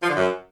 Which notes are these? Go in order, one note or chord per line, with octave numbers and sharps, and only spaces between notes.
F3
D3
F#2